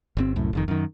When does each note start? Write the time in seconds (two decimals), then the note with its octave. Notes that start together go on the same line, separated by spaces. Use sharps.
0.17 G1 B2 C4
0.36 C2 F#2 A2
0.53 F1 F2 D#3
0.68 F#2 D#3